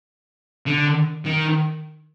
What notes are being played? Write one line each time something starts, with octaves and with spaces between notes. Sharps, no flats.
D3
D#3